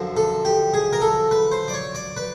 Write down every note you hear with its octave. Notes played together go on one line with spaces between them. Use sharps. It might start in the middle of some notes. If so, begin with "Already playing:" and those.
Already playing: F#2 D3 F3
A4
G4
G#4
A#4
A4
B4
C5
D5
C#5
D5
B4